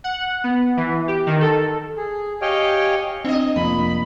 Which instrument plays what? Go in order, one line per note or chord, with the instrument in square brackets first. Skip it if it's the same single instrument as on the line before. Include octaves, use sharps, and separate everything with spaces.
[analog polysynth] F#5
B3
E3
G4
D#3
A4
[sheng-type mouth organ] G#4
G4 C#5 D#5 F5 G5 G#5
[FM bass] C4 [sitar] D4 D#5
[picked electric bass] F1 F3 A#3 [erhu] B5